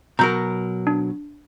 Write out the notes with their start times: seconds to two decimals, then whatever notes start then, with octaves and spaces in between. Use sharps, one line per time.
0.19 B2 F#3 A#4 A#5 G6
0.87 D4